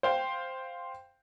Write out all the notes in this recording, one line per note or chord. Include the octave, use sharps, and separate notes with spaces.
C5 F5 G5